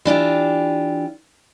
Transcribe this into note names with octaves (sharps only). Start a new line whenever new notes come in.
E3 D4 F4 G4